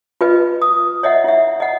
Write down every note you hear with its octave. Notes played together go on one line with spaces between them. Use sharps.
F4 B4 D#5
D#6
C#5 D#5 E5 F#5
E4 E5
D#5 F#5